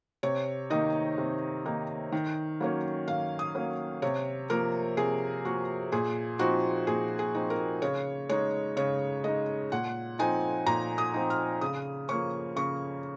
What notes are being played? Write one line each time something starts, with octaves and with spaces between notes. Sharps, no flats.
C3 C#5
D#3 A#3 D#4 D#5
C3
D#3 A#3 D#4
D#3
F#3 A#3 C#4
D#3 F5
D#6
F#3 A#3 C#4
C3 C#5
F3 A#3 A#4
C3 G#4
F3 A#3 F#4
A#2 G#4
F3 C4 D#4 F#4
A#2 G#4
G#4
F3 C4 D#4
A#4
C#3 C#5
G#3 D#4 C#5
C#3 C#5
G#3 D#4 D#5
A#2 F#5
F3 C4 D#4 G#5
A#2 A#5
D#6
F3 C4 D#4
F6
C#3 D#6
F3 A#3 C#4 C#6
C#3 C#6